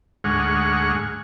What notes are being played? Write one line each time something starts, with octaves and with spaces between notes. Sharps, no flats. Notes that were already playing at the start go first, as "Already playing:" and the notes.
D2 G#2 G#3 F#5 C#6 F6